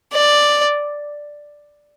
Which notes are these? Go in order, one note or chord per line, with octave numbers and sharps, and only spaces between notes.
D5